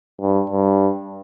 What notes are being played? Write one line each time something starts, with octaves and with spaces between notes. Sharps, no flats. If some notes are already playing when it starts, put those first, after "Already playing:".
G2
G2